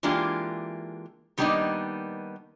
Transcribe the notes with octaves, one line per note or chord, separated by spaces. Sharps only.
E3 G#3 A#3 D4 F4 G4
D#3 G3 A#3 B3 D4 D#4